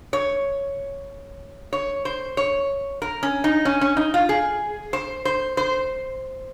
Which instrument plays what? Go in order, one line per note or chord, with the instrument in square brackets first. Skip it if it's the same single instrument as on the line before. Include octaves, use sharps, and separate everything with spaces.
[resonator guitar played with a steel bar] C#5
C#5
C5
C#5
A#4
C#4
D#4
C#4
C#4
D#4
F4
G#4
C5
C5
C5